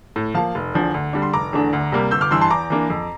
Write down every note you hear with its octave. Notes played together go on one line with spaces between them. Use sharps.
A2
F3 A#3 F5 A5
F1
E2 D3 F3
D2
D3 G3 D4
C6
F1 A#5 D6
E2 D3 A3 D4
D2
C3 G3 A#3
G1 E6 G6
D6 F6
G2 E3 C6 E6
A5 C6
E2 A#5 D6
E3 A#3 D4
F2